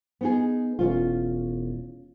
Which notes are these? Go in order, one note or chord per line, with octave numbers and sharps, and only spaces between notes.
B3 D#4 G#4
E1 C#4 F4